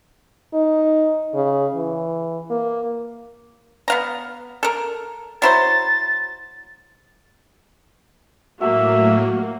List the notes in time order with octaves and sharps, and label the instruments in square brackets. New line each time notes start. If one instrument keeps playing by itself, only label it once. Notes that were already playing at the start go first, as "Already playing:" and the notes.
[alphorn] D#4
C#3
E3
A#3
[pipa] B3 F5 A#5
A4 A#4
[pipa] F#3 E4 C5 [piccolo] A6
[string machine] A2 F#3 A3 [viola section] A#3 [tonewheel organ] F#4 [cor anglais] E5